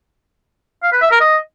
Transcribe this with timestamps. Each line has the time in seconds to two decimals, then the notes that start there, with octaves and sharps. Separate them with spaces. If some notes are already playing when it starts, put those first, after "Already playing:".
0.83 F5
0.92 B4
1.02 E5
1.11 A#4
1.21 D#5